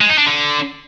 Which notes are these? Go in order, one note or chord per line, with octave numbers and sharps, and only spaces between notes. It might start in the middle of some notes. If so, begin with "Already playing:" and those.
G#3
D#4
D4
D3